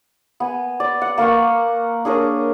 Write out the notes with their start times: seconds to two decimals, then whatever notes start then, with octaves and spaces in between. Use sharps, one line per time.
0.40 B3 G#5
0.80 D5
1.02 F#5
1.18 A#3 A#4 F#5 C#6
2.05 D4 G#4 A#4 C#5